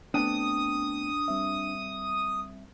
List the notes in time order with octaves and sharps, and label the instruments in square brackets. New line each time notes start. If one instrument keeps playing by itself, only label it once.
[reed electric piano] A3 B3 C4 [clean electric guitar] D4 G5 A5 [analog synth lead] D#6
[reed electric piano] G3 C4 E5